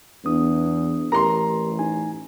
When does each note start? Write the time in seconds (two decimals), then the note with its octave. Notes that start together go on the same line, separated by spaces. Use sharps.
0.25 E2 B3 D4 D#6
1.12 A1 E4 G4 A#4 A#5 C6
1.79 D#4 G#5